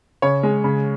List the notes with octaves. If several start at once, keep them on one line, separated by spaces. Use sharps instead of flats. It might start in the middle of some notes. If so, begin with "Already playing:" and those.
C#3 C#5
G#3
C#3